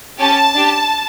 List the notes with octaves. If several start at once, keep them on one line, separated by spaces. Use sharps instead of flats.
C#4 G4 A5
D4 G4